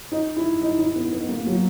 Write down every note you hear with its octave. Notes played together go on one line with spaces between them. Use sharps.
D#4
E4
D#4
D#4
B3
B3
A#3
F#3